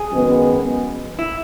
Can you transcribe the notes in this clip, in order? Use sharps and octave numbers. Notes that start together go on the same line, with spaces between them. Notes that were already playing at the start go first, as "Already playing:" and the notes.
Already playing: G#4
F#2 D#3 G#3 B3
E4